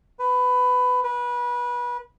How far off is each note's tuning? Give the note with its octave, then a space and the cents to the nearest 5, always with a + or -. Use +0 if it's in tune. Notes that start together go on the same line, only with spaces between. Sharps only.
B4 +15
B4 -25